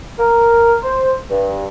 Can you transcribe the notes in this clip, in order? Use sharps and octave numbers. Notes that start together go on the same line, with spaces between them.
A#4
C5
G2